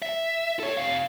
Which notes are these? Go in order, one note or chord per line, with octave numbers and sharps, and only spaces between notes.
E5
A4 C#5
C3 F5